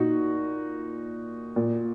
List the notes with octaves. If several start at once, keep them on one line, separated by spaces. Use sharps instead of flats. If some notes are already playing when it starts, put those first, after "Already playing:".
Already playing: A#2 D#4 F#4
A#2